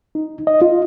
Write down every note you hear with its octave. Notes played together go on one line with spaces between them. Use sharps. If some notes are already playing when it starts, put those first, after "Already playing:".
D#4
D#5
F4